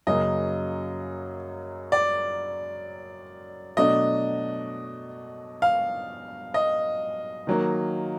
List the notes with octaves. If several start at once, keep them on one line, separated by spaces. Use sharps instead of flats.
F#2 C#3 F#3 A#3 D#5
D5
B2 F#3 A3 D4 D#5
F5
D#5
D#3 F#3 A#3